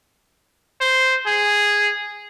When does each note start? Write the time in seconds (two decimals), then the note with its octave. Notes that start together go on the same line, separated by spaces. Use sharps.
0.81 C5
1.27 G#4